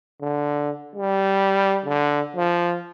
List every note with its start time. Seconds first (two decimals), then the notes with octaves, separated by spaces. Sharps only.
0.21 D3
0.96 G3
1.86 D3
2.36 F3